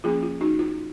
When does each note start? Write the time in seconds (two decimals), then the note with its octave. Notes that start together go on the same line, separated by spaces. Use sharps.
0.04 F3 A#3 C#4 F4 G#4
0.23 F4
0.41 D#4 F#4
0.59 F4